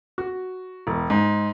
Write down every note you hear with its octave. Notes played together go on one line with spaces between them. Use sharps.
F#4
E1
G#2